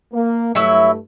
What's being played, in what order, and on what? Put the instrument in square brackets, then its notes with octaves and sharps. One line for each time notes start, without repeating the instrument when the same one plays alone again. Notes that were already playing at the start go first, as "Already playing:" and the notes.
[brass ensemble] A#3
[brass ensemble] G2 A3 [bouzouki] F#3 E4 E5